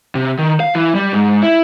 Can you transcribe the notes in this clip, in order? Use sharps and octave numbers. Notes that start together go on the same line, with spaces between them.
C3
D#3
F5
E3
G3
G#2
E4